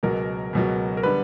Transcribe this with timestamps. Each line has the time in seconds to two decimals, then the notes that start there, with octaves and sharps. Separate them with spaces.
0.03 C#2 B2 F#3 A#4
0.53 C#2 B2 F#3
0.97 A#4
1.03 D3 G3 B3 B4